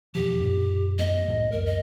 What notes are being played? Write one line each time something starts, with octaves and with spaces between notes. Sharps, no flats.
E2 B2 F3 G4
F#2 A#2
F#2 A3 B3 D#5
C2 A2 A3
C#2 F#2 A#4
D#5